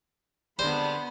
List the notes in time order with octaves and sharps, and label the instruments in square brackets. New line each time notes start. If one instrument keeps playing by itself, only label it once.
[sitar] D3 G#3 C4 [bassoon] G3 [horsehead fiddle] B3 B5 [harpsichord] C5